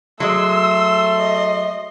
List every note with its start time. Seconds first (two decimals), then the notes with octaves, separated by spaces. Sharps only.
0.20 F#3 G#3 A3 C6 E6
1.18 D#5